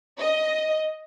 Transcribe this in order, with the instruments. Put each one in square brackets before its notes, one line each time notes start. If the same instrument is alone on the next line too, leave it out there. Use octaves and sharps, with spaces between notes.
[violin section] D#5